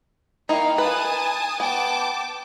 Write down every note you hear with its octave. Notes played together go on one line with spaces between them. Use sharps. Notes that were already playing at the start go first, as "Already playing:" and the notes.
A#3 D#4 E4 F5 G5
B4 G#5 A5 D#6
B3 G5 A5 D6